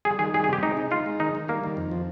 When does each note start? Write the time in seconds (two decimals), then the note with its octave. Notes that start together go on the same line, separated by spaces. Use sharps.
0.05 G3 G#4
0.19 D#3 G#4
0.34 G3 G#4
0.44 G#4
0.48 C3 G4
0.63 G#3 D#4
0.77 D#4
0.91 D#4 F4
1.06 G#3
1.19 D#3 D#4
1.35 D#3
1.48 G3 A#3
1.63 D#3
1.77 F2
1.91 F3